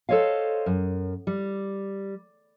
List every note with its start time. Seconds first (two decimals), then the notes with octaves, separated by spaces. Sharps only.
0.09 A4 C5 C#5 D#5 F5
0.66 F#2
1.27 G3